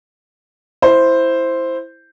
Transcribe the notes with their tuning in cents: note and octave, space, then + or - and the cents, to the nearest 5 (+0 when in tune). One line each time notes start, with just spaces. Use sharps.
E4 +5 C5 +0